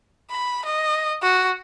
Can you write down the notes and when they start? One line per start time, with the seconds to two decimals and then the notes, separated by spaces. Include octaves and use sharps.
0.31 B5
0.65 D#5
1.22 F#4